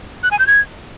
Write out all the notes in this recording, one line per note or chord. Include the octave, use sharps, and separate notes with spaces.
F#6
G#5
G6
G#6